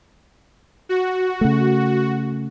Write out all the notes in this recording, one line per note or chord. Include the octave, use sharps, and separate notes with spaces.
F#4
C#3 A3